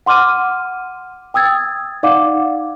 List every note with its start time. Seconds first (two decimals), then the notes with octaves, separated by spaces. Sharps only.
0.06 F#5 C6 D6 F6 D#7
1.34 G5 D#6 E6 G#6 A6
2.03 D#4 D5 F5 F#5 D6